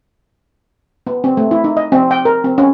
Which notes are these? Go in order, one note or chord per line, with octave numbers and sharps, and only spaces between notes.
B3
C4
A3
E4
D#4
D#5
C4
G5
A#4
C4
C#4